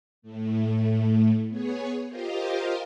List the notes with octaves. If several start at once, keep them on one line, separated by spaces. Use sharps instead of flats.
A2 A3
B3 G#4 C#5
F4 G4 A#4 C5 D#5 F5